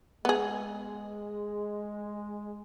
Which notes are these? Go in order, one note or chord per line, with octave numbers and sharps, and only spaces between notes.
G#3 B3 G#4